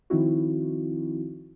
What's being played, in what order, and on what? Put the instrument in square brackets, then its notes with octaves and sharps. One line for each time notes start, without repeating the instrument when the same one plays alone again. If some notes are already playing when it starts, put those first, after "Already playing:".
[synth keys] D#3 F3 C4 D#4 E4 F#4